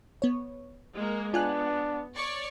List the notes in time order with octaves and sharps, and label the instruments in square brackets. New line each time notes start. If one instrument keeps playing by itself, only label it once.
[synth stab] B3 C#5
[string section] G#3 A#3
[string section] B3 [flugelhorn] D4 [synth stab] F4 G#5 F#6
[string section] C#5 D5 C#6